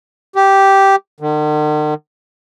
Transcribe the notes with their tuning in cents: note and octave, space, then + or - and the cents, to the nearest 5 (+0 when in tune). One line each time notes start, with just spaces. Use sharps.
G4 -5
D#3 -45